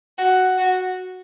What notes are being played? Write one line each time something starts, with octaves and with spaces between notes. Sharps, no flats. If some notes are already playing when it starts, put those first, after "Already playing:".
F#4
F#4